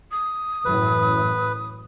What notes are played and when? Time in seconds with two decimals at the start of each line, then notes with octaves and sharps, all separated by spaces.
0.12 D#6
0.65 F#2 A2 E3 B4